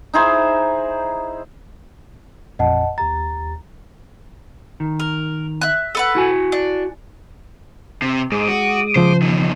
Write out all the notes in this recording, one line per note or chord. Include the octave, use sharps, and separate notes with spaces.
D#4 E4 G#4 C5
A1 F2 A#2 D#5 F#5 A5
D#2 G4 A#5 A6
D#3
A#4
E5 F#6
A4 B4 F#5
E4 F#4 G#5
D4
C3
G#2 G#3 D6 D#6
F#4
C#3 F3 C5
E2 D#3